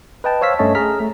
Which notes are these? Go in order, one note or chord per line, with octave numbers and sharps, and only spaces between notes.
B4 D#5 G5 A5
C5 C#5 F5 E6 B6
G2 A3 C#4 C#5 D#5 A5
G#4 A#5 F6 B6
A3